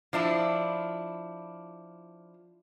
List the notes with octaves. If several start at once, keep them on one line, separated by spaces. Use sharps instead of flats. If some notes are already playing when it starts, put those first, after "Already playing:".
F3 D4 E4